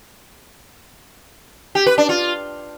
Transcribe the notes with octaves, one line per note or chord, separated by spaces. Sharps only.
G4
B4
D4
F4